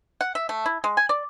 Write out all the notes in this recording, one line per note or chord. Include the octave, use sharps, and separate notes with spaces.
F#5
E5
A3
E4
G#3
G#5
D5